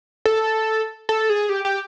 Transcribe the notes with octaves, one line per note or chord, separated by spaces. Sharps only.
A4
A4
G#4
G4
G4